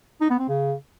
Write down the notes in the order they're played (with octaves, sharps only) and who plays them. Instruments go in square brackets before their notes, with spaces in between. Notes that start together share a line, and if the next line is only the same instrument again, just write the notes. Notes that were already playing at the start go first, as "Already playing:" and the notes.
[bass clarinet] D#4
B3
C4
C#3